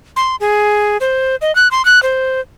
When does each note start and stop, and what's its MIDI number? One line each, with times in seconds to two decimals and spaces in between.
0.16 0.36 84
0.40 0.97 68
1.01 1.36 72
1.42 1.54 75
1.55 1.68 90
1.71 1.85 84
1.85 2.02 90
2.03 2.41 72